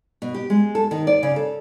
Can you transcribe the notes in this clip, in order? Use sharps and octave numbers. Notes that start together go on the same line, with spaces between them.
B2
G4
G#3
A4
D#3
D5
C#3
A4